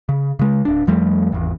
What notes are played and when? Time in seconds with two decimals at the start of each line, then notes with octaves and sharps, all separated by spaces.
0.09 C#3
0.39 C#3 G#3
0.65 D1 D4
0.87 F2 F3 G3 A3
1.32 G#1 E2